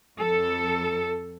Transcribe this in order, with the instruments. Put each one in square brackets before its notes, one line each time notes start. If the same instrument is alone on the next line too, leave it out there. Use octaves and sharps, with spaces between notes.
[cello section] F2 A4